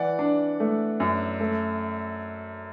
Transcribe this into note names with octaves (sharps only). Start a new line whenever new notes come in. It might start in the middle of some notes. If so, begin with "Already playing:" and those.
Already playing: E3 D5 F#5
D4
A3
F#2
A3